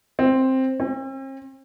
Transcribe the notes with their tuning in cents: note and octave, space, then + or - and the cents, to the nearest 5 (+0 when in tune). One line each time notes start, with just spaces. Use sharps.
C4 +5
C4 +45